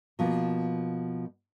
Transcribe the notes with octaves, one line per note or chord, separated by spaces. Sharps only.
B2 F3 A#3